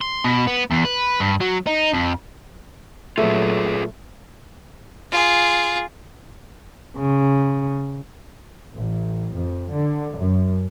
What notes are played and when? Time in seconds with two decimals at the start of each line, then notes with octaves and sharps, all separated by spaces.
0.01 C6
0.24 B2
0.47 B3
0.71 E2
0.84 B4
1.20 G2
1.40 F#3
1.67 D#4
1.93 F2
3.18 A#2 F#3 A3 F4 G#4 B4
5.11 F4 G#4
6.97 C#3
8.75 A1
9.33 F2
9.70 D3
10.16 F#2